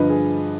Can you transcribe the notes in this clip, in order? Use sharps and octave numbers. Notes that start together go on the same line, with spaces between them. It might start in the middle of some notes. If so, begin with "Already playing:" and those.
Already playing: G2 D3 F3 B4 D#5
G#4